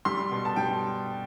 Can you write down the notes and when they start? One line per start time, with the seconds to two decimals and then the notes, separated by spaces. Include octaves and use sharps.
0.05 G3 C6
0.31 B2
0.45 A5
0.56 G3 G5